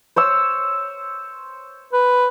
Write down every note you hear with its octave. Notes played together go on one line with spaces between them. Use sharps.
C5 C#5 E6
B4